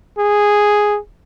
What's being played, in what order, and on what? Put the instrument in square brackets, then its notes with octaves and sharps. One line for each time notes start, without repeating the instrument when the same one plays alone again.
[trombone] G#4